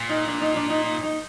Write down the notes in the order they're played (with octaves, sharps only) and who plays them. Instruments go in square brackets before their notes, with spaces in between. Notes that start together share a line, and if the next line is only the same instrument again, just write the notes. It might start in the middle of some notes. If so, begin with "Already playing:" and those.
Already playing: [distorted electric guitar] A#2
[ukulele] D#4
D4
D#4
D4
D#4
D#4
D#4